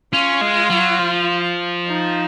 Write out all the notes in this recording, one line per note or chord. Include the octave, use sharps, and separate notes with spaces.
C#4 F4
G#3
F#3
F3
D#4